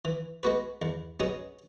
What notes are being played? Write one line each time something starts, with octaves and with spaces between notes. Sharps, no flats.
E3
G#3 B3 F#4 B4
E2
B2 F#3 C#4 G#4